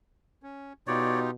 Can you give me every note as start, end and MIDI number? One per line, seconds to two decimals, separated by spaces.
0.43 0.73 61
0.87 1.34 47
0.87 1.31 63
0.87 1.31 65
0.87 1.31 67
0.87 1.20 73
0.87 1.20 74